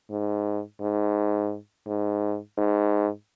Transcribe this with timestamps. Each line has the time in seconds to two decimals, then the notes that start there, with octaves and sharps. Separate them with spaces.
0.11 G#2
0.81 G#2
1.87 G#2
2.58 G#2